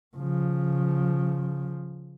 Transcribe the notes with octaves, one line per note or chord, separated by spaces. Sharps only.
C#3 F3